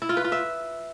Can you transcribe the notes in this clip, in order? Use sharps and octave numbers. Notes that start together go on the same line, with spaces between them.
E4
F4
B4
F4
E5